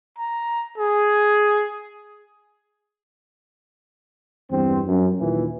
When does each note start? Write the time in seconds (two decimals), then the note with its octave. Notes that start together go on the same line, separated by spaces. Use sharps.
0.18 A#5
0.78 G#4
4.51 E2 G2 C4
4.87 F#2
5.20 D#2 A#2 E3